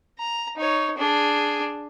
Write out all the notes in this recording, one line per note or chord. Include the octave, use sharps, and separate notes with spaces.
A#5
D#4 C#5
D4 G#4